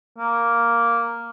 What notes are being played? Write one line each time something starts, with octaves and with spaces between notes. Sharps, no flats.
A#3